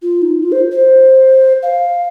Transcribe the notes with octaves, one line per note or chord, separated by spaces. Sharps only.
F4
D#4
F4
C5
C5
F5